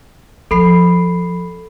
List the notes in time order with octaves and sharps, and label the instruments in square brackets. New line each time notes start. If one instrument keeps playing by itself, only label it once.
[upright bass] F3 [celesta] A4 B5 C7